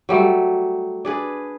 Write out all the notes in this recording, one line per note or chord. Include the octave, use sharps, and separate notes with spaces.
F#3 G3 A3
D4 G#4 B4